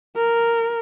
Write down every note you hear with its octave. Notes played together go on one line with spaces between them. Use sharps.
A#4